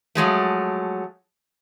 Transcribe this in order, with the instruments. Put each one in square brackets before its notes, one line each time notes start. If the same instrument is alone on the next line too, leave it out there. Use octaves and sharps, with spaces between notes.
[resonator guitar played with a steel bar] F3 F#3 G#3 A3